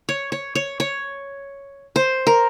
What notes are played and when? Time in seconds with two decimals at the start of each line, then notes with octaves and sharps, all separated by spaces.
0.09 C#5
0.32 C#5
0.55 C#5
0.80 C#5
1.96 C5
2.27 A#4